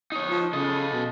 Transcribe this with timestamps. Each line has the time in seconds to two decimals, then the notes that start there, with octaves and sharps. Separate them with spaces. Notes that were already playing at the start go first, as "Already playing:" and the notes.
0.12 D#4 C#5
0.29 F3
0.53 C#3 A4 D#5
0.93 B2